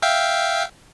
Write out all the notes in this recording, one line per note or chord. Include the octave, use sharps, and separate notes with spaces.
E5 F5 G5